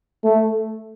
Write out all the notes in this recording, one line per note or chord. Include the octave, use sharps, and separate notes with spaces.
A3